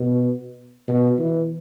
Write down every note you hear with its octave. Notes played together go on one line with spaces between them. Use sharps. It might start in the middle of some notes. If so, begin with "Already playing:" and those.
Already playing: B2
B2
E3